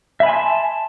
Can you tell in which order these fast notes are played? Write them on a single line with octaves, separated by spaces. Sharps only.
E5 B5 G#5 C6 A5